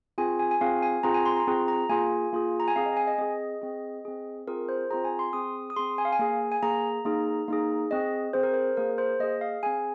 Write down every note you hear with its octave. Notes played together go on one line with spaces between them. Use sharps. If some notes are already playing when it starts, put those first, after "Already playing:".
C4 F4 G#4 G#5
G#5
G#5
C4 F4 G#4 F5
G#5
C4 F4 G#4 A#5
G#5
C6
A#5
C4 F4 G#4
A#5
A#3 F4 G#4 G#5
A#3 F4 G#4
A#5
G#5
C4 G#4 F5
D#5
G#5
D#5
C4 G#4 D#5
C4 G#4
C4 G#4
C4 F4 G#4 A#4
C5
C4 F4 G#4 A#5
G#5
C6
C4 G#4 D#6
D#6
C4 G#4 C6
G#5
F5
G#5
A#3 G#4
G#5
A#3 G#4 A#5
A#3 D#4 G#4
A#3 D#4 G#4
C4 G#4 D#5
C4 G#4 C5
A#4
C5
A#3 G#4 A#4
C5
A#3 G#4 D#5
F5
C4 G#4 G#5